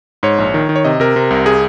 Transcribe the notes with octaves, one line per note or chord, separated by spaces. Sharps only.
G#2 C#5
A#1
D#3
D#3
C#5
C3 D#5
C3 A#4
C3
C2
G#4